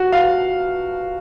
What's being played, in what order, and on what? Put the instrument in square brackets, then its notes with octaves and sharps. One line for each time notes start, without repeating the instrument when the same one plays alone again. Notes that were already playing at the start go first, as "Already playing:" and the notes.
Already playing: [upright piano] F#4
F5